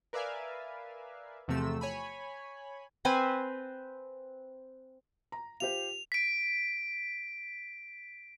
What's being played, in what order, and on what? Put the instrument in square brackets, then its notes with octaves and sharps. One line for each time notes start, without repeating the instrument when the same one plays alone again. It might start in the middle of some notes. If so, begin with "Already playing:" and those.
[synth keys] A#4 B4 D5 E5 F5 G#5
E2 C3 F3 A3 E6
C#5 G#5 B5
[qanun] C4 B4 C5 G#5
[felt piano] A#5
[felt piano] F4 G4 C5 [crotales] F7
[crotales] B6 D7